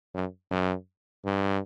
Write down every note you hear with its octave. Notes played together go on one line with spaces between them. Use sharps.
F#2
F#2
G2